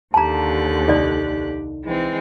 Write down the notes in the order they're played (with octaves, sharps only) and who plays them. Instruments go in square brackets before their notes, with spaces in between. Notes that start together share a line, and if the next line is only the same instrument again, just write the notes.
[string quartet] D#2 D3 F#6 [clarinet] G4 [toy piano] A5 A#5
[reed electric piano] C2 D#4 [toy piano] A4 D5
[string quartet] E3 G#3 C4